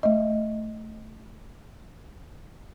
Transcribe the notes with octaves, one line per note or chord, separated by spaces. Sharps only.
A3 D#5